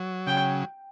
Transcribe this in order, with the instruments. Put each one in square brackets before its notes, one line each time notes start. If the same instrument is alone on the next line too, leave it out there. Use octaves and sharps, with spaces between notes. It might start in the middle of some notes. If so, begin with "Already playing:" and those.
Already playing: [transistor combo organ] F#3
[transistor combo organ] C#3 [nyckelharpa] G5